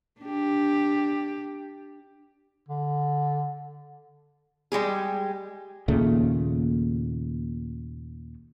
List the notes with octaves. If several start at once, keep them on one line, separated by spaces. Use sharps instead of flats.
D4 G4
D3
G3 G#3 G4 G#4
D#2 A#2 C#3 A3